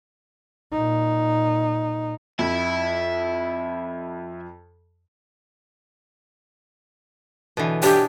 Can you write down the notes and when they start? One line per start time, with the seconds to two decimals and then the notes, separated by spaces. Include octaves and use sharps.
0.72 A#2 D#4
2.39 F2 E5 B5
7.57 B2 D3 E3
7.83 D4 E4 G4 G#4